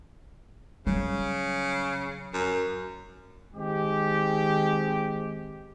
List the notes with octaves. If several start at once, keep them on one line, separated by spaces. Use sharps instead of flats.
C#3 F#3 G3
F#2
D#3 G#3 C4 G4